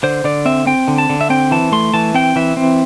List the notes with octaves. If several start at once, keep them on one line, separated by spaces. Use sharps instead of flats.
D3 C5
D3 D5
C4 E5
C4 G5
D3
A5
D3
E5
C4 G5
E3 A5
A3 C6
E3 A5
C4 G5
E3 E5
C4